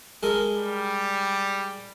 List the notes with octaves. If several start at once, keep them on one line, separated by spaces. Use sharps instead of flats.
G#3 A4 A#4
G3